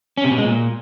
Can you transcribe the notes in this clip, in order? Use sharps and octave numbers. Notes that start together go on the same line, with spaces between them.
C#4
C3
B2
G#3
A#2